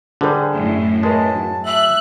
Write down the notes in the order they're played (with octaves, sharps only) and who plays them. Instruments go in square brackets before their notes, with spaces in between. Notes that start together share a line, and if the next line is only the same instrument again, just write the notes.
[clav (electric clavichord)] D3 G3 [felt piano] G#4 A4 C5
[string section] F#2 A2
[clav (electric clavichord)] G#3 [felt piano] A#4 B4 C#5 [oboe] A5
[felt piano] F#3
[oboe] E5 [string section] F#6